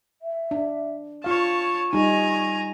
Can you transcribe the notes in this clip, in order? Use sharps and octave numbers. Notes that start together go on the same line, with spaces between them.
E5
D4
F4 C#5 F5 A5 C#6
G3 D#4 G#5 A#5